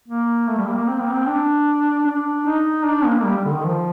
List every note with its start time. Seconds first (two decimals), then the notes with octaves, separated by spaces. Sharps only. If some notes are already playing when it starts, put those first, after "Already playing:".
0.08 A#3
0.48 A3
0.58 G3
0.67 A#3
0.77 A#3
0.87 C4
1.01 A#3
1.13 C4
1.27 D4
2.06 D4
2.46 D#4
2.85 D4
3.06 A#3
3.25 G3
3.45 D3
3.54 D#3
3.64 F3